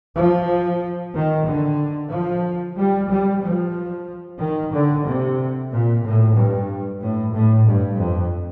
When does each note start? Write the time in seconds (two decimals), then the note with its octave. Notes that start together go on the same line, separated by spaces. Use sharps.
0.14 F3
1.13 D#3
1.45 D3
2.10 F3
2.76 G3
3.09 G3
3.42 F3
4.39 D#3
4.72 D3
5.04 C3
5.70 A#2
6.03 A2
6.35 G2
7.01 A2
7.33 A2
7.66 G2
7.99 F2